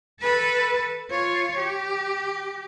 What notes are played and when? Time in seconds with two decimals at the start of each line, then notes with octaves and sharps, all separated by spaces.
0.21 A4 B4
1.10 F4 C#5
1.58 G4